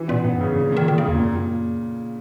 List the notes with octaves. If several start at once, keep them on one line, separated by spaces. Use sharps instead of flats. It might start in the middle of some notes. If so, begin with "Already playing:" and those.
Already playing: E3
A#2 B3
G#2 B3
F#2
G#2 C#3
A#2 D#3
E3
A#2 D#3
A#2 D#3
C#3
A#2
E2
F#2 A#2
A#2